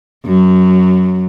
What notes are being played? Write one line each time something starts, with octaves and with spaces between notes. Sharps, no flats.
F#2 F#3